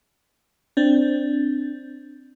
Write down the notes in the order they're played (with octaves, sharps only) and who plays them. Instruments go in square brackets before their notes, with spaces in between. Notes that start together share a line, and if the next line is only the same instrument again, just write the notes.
[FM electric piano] C4 D4